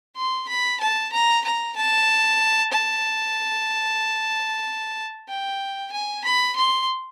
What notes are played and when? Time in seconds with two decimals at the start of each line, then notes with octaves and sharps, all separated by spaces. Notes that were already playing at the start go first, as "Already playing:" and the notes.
0.16 C6
0.49 B5
0.80 A5
1.12 A#5
1.44 A#5
1.76 A5
2.72 A5
5.28 G5
5.92 G#5
6.24 B5
6.56 C6